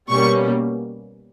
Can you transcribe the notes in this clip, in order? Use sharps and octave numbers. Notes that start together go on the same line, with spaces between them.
B2 G3 A#3 C#4 C#6